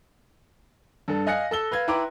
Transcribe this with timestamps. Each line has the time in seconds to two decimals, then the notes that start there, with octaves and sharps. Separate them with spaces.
1.08 G2 A4
1.27 D#5 F5 G#5 F#6 A#6 C#7
1.51 A4 E6 G7
1.71 B4 F5 G#6
1.88 E4 B4 G5 A#5 C6 D6